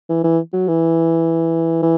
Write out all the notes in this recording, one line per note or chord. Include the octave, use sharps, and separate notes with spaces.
E3
E3
F#3
E3
E3